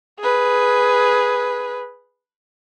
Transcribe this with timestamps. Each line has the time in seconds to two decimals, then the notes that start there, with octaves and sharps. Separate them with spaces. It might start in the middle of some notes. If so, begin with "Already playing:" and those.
0.19 G#4 B4